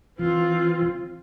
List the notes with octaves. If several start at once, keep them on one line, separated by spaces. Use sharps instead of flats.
E3 C4 F4